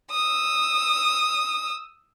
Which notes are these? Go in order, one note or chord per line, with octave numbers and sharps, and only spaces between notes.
D#6 E6